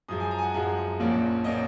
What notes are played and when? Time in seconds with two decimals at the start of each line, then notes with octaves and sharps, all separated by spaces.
0.08 F#2 F3 G#3 D#6
0.20 G#5
0.31 A#5
0.38 G#5
0.42 F#5
0.54 F#2 F3 G#3 F#5
1.00 A#1 A#2 F3 A#3 C#4
1.44 A#2 F3 A#3 C#4 D#5